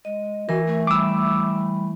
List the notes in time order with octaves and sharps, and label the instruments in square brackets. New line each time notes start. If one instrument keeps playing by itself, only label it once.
[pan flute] G#3 [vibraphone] D#5
[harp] E3 [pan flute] F#4 [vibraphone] A#4
[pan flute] A3
[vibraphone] G3 B5 [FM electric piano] D6 E6